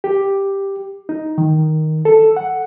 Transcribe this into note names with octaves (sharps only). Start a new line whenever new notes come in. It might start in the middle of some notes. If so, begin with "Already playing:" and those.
G4
D#4
D#3
A4
F#5